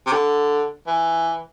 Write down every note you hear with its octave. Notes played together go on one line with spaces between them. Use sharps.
C3
D3
E3